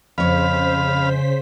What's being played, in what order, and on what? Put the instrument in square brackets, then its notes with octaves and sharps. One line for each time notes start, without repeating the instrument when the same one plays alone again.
[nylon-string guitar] F2 C#5 [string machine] C#3 C5 B6 [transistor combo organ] F5 B5